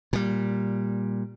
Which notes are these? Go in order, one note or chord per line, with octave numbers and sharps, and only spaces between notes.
A#2 G3